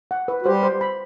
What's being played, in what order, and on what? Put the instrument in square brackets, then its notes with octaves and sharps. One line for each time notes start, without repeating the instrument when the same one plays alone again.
[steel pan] F#5
B4
[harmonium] F#4
[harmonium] G3 G4 [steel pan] C5
[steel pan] C5
B5